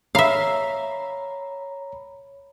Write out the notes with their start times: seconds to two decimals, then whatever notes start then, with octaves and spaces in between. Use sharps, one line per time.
0.15 C#5 E5 F5 A#5 B5